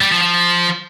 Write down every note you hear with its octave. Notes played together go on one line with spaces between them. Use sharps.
G3
F3
F3